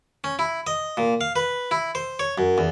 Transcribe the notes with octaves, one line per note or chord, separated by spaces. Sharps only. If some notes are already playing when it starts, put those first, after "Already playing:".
C#4
E4
D#5
A#2
F5
B4
E4
C5
C#5
F#2
E2